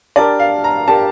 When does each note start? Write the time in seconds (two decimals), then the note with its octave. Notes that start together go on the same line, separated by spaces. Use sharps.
0.16 D4 G4 A#4 D5
0.40 F5
0.64 A#5
0.88 D4 G4 A#4 A5